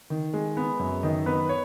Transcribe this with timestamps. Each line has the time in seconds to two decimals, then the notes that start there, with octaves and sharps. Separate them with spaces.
0.10 D#3
0.34 G#3
0.57 B3
0.79 F#2
1.03 D#3 D#5
1.26 B3 B4
1.49 C#5